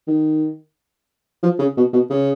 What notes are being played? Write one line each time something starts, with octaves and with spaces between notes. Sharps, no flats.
D#3
F3
C#3
B2
B2
C#3